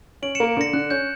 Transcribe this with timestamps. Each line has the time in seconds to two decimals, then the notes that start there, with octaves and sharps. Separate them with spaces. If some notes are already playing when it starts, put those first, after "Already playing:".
0.22 C#4 D7 F#7
0.35 A#3 C#7 E7
0.57 D3 A#6 C#7
0.73 D3 F#6
0.90 C#4 G6